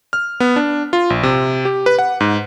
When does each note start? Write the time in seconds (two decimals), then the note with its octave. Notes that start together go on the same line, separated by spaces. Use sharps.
0.13 F6
0.40 B3
0.56 D4
0.93 F4
1.10 A#1
1.23 C3
1.65 G4
1.86 B4
1.99 F#5
2.20 G#2